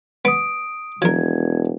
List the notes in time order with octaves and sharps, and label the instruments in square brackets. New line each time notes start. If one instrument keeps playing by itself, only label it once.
[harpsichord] B3 [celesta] D#6 D7
[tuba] E1 [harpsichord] F3 A#4 [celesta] G#6